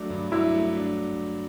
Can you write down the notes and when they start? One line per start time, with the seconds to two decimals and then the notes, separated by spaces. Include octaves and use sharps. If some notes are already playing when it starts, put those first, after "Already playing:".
Already playing: F#3 A3 D4
0.10 G2
0.32 F#3 E4
0.54 A3
0.77 D4